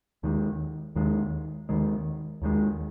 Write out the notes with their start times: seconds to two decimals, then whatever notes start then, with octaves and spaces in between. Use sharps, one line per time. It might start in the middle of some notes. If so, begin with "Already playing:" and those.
0.23 D#2 D#3 G#3
0.96 D#2 D#3 G#3
1.69 D#2 D#3 G#3
2.42 D#2 D#3 G#3